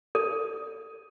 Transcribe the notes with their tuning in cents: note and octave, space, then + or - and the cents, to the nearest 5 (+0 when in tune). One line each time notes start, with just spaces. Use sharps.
A4 +20